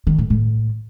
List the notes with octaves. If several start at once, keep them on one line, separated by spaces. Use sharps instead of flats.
D#3
A2
A2